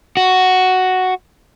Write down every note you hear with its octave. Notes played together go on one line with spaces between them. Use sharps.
F#4